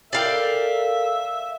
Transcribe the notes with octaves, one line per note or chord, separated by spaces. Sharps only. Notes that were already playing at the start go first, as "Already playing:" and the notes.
A4 A#4 D5 E5 F5 G5